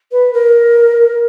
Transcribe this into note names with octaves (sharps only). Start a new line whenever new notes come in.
B4
A#4